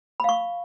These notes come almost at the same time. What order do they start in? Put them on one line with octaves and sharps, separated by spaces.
B5 F5 C#6